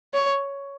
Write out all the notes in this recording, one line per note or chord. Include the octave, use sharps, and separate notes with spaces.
C#5